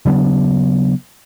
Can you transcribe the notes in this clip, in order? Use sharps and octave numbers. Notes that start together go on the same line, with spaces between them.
C#3 F#3 B3 D4